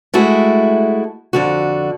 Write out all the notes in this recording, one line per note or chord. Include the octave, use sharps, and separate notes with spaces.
G#3 A3 E4 F#4
F2 D3 F#4